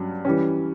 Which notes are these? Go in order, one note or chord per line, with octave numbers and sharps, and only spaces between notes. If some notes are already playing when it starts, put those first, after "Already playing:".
Already playing: G2 F#3 C#4
E3 G3 C#4